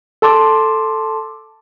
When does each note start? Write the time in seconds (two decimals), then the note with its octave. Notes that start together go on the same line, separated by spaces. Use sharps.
0.22 A4 A5 C6 D6